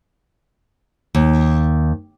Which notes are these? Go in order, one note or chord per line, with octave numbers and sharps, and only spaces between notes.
D#2